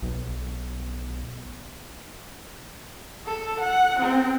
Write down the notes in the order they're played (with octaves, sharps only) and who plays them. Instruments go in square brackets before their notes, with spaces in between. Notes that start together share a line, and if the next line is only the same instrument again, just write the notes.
[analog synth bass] B1
[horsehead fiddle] A4
F#5
C4